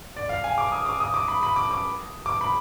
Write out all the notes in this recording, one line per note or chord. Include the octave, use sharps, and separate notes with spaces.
D5
F5
G#5
D6
D#6
D6
D#6
D6
B5
B5
D6
D6
D6
B5